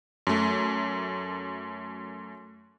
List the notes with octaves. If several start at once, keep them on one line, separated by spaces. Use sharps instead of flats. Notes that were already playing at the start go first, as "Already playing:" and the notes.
F#2 A3